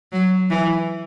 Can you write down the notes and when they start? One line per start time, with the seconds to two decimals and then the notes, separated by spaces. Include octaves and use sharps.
0.13 F#3
0.50 E3